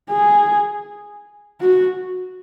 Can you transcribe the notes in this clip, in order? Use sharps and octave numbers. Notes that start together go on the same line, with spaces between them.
G#4
F#4